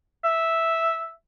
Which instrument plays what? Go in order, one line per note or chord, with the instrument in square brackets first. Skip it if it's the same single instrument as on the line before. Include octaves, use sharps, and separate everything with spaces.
[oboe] E5